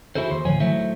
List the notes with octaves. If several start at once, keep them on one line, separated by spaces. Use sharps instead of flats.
E4 F#4 G#4 A4 C5
D#2 C5
D2 A2 F3 C#5 G#5
D#3 F#3 A3 E4 C5 E5